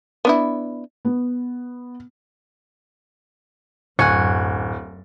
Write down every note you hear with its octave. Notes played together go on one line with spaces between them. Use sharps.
B3 D4 E4
B3
D1 F#2 F#5 G#5 C#6